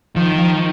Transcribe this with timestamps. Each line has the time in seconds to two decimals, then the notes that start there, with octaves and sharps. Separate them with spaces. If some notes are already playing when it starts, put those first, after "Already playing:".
0.16 D#3 F3
0.38 F3